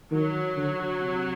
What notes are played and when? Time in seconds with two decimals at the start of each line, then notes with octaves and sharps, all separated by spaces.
0.12 D#3 F#3
0.57 D3
1.01 C3